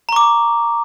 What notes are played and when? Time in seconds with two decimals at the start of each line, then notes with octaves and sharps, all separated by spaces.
0.09 A#5
0.13 C#6
0.16 D6